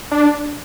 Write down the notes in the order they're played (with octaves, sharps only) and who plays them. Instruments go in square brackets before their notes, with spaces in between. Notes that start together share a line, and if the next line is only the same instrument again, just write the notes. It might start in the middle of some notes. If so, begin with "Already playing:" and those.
[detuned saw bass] D4